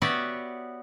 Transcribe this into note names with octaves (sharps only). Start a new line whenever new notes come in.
B3 F#4 G4 C#5 D5 E5